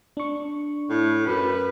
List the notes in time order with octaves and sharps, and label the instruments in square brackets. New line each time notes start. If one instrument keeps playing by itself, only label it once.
[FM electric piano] D4 C#6
[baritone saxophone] A2
[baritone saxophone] F#2 [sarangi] B4